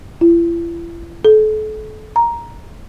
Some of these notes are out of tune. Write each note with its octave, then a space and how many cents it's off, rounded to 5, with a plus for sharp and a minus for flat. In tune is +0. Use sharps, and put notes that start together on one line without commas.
E4 +45
A4 -35
A#5 +10